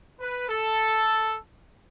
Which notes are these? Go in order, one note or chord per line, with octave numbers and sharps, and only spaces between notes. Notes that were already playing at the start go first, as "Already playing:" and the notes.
B4
A4